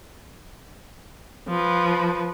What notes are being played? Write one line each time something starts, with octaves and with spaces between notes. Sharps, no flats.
F3 B4